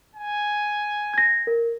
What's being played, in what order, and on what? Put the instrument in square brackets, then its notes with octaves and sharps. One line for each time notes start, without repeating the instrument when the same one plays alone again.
[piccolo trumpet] G#5
[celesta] G#6 A#6
A#4